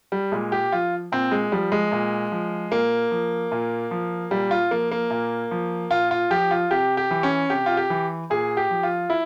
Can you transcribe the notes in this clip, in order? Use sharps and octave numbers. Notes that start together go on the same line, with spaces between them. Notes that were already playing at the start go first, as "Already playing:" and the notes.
G3
A#2 G#3
G4
F3 F4
A#2 C4
G#3
F3 G3
G#3
A#2
F3
A#2 A#3
F3
A#2
F3
A#2 G3
F4
F3 A#3
A#3
A#2
F3
A#2 F4
F4
F3 G4
F4
C3 G4
G4
E3
C#4
C3 G4
F4
G4
E3
A#2 G#4
G4
F3
F4
E4